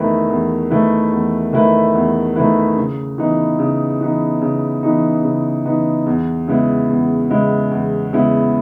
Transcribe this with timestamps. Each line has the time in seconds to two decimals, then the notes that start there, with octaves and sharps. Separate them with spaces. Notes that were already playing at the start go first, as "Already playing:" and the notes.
Already playing: E2 D#3 A3 E4 B4
0.29 E2
0.70 D#3 A3 E4 B4
1.12 E2
1.53 D#3 A3 E4 B4
1.94 E2
2.36 D#3 A3 E4 B4
2.77 C#3
3.18 E3 B3 D#4
3.59 C#3
4.00 E3 B3 D#4
4.42 C#3
4.83 E3 B3 D#4
5.24 C#3
5.66 E3 B3 D#4
6.06 E2
6.48 C#3 G#3 B3 E4
6.89 E2
7.30 C#3 G#3 B3 E4
7.71 E2
8.13 C#3 G#3 B3 E4